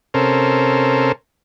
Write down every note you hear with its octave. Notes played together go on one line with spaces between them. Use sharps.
C3 C#4 A4 A#4 C5